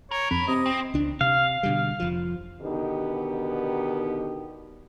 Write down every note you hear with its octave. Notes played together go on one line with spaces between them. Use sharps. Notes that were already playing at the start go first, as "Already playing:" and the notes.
B1 A#4 C#5
F2 B5
C3 D#5
C4
C#2 D4
C3 F5
B2 D3 G3
F1 F3
B2 D3 D#3 B3 D#4 G4